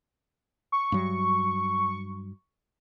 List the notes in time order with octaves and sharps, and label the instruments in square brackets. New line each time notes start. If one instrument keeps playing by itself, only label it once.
[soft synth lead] C#6
[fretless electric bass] G2 F#3